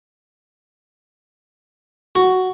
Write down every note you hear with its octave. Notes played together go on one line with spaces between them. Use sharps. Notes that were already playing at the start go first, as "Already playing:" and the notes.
F#4